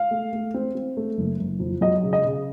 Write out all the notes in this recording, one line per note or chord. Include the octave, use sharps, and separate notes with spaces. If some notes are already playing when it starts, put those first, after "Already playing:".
Already playing: F5
A3
A3
C4
C4
A3
F#1
F#1
F2
F#3 D#5
C#3
D#5
C#3